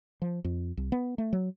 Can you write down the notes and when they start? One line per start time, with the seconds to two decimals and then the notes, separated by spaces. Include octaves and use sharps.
0.22 F3
0.44 F2
0.77 C2
0.92 B3
1.18 A3
1.33 F#3